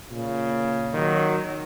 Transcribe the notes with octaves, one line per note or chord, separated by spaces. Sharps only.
A#2 C#3
D#3 F#3